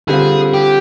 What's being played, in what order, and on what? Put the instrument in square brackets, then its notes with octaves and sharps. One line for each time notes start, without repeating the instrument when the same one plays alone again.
[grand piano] D3 G3 C4 F4 [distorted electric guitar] G#4
[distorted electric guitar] G4